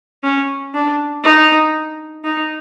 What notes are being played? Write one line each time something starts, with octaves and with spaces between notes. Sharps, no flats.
C#4
D4
D#4
D#4